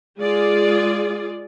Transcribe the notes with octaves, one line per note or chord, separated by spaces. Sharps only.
G#3 F4 G#4 D5